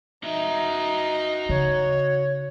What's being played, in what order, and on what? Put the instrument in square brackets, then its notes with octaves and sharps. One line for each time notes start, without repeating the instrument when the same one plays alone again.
[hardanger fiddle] D#4 [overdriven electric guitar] F#4 E5
[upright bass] C#3 [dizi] C#5